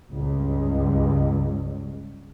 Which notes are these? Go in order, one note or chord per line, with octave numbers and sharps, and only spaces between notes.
C#2 G2